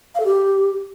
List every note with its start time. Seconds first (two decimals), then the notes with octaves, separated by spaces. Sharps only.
0.15 F5
0.20 A4
0.25 G4